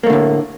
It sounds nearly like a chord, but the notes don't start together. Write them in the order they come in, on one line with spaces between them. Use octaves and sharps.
A#3 A3 D3 A2